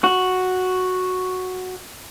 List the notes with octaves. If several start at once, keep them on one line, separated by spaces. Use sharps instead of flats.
F#4